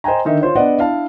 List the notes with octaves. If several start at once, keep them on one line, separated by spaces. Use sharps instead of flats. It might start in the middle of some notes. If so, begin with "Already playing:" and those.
C5 D#5 G5 G#5 A#5
D3 D#3 D#4 E5
F4 C5 C#5
B3 D4 D5 D#5 F#5
D4 E4 F5 A5